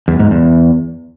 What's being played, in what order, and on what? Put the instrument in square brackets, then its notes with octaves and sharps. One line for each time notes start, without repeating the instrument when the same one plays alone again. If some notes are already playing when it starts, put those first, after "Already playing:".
[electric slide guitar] E2
G#2
E2